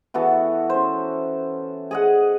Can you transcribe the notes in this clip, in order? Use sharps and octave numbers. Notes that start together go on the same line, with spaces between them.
E3 B3 F#4 A4
C#4 C5
G#4 D#5 F#5